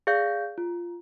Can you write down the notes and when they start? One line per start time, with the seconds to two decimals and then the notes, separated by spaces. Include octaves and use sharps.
0.07 G#4 D5 F5 G6
0.58 F4